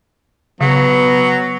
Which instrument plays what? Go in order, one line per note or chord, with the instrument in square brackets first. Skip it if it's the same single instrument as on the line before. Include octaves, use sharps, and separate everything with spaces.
[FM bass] C#3 [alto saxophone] F#3 [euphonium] B3